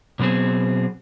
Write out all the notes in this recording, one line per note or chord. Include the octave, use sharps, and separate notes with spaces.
B2 F#3 B3 C4 G#4